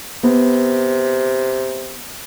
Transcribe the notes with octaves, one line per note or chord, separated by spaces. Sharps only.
C3 B3